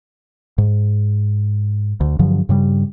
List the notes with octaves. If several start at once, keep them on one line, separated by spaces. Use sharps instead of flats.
G#2
D2
G2 D3 F3 F#3
G2 C#3 G3